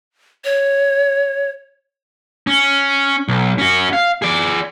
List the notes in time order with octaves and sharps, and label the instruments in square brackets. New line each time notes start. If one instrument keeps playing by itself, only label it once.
[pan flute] C#5
[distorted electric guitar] C#4
B1
C#4 F#4
F5
G#4 D5